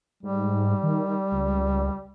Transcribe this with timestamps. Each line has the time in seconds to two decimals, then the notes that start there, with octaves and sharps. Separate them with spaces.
0.23 G#2 G3
0.83 D#3
1.32 C#2